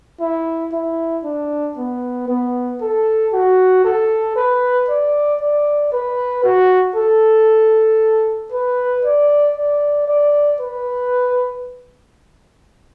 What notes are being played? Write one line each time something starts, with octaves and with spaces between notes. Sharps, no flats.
E4
E4
D4
B3
B3
A4
F#4
A4
B4
D5
D5
B4
F#4
A4
B4
D5
D5
D5
B4